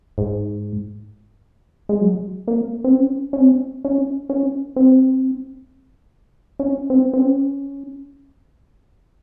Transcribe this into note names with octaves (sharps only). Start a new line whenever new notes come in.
G#2
G#3
F#3
A#3
C4
C#4
C#4
C4
C#4
C#4
C4
C#4
C4
C4
C#4